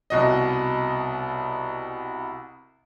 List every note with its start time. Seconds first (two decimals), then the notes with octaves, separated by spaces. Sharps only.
0.10 C2 B2 D#5